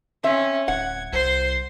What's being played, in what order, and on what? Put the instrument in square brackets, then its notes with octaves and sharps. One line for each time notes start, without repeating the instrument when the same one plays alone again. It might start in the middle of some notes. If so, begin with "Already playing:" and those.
[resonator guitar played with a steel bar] C4 E5 [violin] C#4
[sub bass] D1 [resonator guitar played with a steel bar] F#5 [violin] G#6
[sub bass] C2 [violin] C5 C6